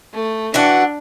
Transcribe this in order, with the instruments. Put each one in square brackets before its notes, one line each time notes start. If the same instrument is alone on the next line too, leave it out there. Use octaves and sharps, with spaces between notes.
[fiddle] A3
[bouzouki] E3 F#4 F#5 [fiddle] D4